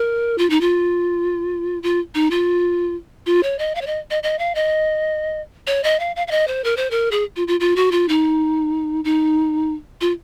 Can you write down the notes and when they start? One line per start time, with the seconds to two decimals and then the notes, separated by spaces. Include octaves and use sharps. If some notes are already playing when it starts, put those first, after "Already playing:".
Already playing: A#4
0.38 F4
0.50 D#4
0.61 F4
1.83 F4
2.15 D#4
2.31 F4
3.26 F4
3.43 C#5
3.59 D#5
3.75 F5
3.81 C#5
3.87 D#5
4.10 D#5
4.23 D#5
4.39 F5
4.55 D#5
5.67 C#5
5.84 D#5
6.00 F5
6.16 F5
6.27 F5
6.31 D#5
6.47 C5
6.64 A#4
6.77 C5
6.91 A#4
7.11 G#4
7.36 F4
7.48 F4
7.60 F4
7.76 F#4
7.91 F4
8.09 D#4
9.04 D#4
10.01 F4